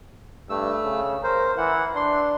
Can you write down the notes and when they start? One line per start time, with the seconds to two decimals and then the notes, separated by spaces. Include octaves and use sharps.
0.50 G2 A3 E6
0.84 C#3
1.23 A#4 C5
1.57 E3 F#5
1.96 D4 C6